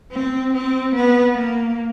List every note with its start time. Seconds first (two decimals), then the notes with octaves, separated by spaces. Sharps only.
0.11 C4
0.53 C4
0.95 B3
1.38 A#3